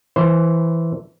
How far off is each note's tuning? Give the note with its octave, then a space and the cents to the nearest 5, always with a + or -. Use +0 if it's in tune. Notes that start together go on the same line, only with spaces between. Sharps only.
E3 +0 C5 +0